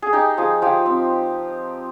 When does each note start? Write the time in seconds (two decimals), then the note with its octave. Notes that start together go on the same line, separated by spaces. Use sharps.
0.02 G#4
0.13 D#4 G4
0.38 F3 G#4
0.62 F3 G4
0.86 C4